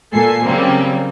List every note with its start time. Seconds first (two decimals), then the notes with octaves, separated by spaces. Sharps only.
0.13 A#2 A4 G#5 C7
0.44 C#3 F#3 G3 A#3 C4